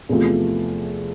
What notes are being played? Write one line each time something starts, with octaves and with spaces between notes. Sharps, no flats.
E2 C3 F3 A3